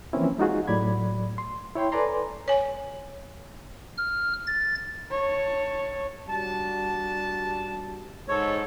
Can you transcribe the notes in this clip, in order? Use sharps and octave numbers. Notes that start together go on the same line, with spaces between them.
E3 F3 A#3 C4 C#4 E4
G#3 D#4 F4 F#4 G#4
A2 F#3 D5 B5 G#6
C6
E4 C#5 G5 C6
A4 B4 D5 G#5 A#5 C6
C#5 G#5
F6
A6
C#5 A5
G3 D4 F#4 A5
G#2 A4 C#5